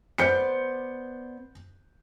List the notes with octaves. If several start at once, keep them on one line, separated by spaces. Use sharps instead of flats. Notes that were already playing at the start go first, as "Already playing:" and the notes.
B3 C5 D5 G6 C#7